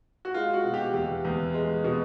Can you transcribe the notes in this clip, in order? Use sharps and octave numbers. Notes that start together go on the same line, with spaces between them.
F#4
G#3 F4
F#4
B2
G4
E2 G4
E2
G#3
B2